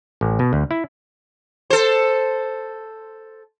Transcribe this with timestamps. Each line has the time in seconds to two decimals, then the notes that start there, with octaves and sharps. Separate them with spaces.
0.21 A1
0.39 B2
0.53 D2
0.71 E4
1.70 A4 C5